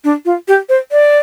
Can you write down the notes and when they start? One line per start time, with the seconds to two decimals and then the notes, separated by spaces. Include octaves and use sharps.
0.04 D4
0.25 F4
0.48 G4
0.69 C5
0.92 D5